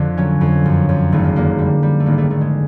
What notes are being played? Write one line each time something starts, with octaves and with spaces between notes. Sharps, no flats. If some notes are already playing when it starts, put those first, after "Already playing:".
Already playing: F2 D3
F#3 C#4
F2
F#2
F#2
G#1 A3
A#3
D3 A#3
G3
G3
A3
G#1 A#3
A3
G#1 A3
G#3